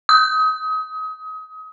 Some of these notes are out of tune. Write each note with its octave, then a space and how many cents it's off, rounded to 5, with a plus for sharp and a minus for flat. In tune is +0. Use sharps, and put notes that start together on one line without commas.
D#6 +30